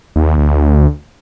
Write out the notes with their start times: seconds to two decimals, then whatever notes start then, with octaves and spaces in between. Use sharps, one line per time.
0.16 D#2
0.37 D2